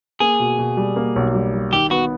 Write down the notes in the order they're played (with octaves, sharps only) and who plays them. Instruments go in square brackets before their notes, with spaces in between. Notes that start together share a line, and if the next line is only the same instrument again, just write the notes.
[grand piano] A#3 [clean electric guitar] G#4
[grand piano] B2
B2
G3
A#3
B1
G3
G3
[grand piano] D#3 [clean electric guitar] G4
[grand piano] B3 [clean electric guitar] F#4